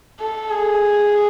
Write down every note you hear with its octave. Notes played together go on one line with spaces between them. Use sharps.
A4
G#4